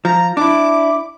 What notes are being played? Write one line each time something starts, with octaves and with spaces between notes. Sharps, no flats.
F3 A#5
D4 E4 D6